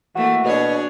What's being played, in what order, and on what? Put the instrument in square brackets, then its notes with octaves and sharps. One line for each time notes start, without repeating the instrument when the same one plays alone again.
[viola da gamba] E3 A3 A#3 [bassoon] F#4
[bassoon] B2 [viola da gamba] D4 G#4 C#5